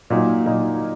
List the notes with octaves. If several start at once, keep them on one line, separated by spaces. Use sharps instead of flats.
A#2 F#3 A#3 D#4
A#2 F#3 A#3 D#4